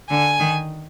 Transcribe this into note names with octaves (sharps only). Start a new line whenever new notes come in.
D3 G#5
D#3